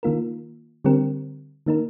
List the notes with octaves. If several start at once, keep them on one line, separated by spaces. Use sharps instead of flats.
D#3 A#3 F4 A#4
D3 G3 C4 G4 A#4
D#3 A#3 D#4 A#4